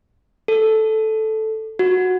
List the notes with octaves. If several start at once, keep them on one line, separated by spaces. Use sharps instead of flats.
A4
F#4